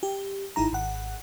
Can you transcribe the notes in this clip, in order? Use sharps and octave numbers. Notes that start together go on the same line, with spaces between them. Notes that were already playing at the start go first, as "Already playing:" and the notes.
G4
G#1 D#4 E4 A#5
G#1 F#5